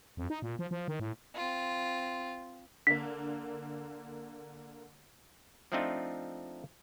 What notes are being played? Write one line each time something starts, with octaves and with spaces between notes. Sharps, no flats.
F2
D#4
A#2
F3
F3
D#3
A2
C4 F4
D3 A#3 B6
F3 A3 C4 D4 D#4 F4